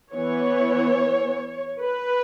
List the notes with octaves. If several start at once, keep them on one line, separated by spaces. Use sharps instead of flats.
E3 B3 C#5
B4